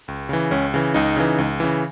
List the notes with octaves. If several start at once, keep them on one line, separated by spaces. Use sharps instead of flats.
C#2
C#3 E3
C#2 C#4
C#3 E3
C#2 D#4
C#3 E3
C#2
C#3 E3